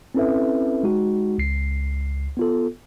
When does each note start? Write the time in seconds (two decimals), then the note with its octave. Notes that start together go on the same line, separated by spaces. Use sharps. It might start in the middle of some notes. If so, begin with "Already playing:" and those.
0.15 C4 C#4 E4 A4 B4 E5
0.83 G#3 D#4 F#4
1.38 C#2 C7
2.37 B3 F4 A4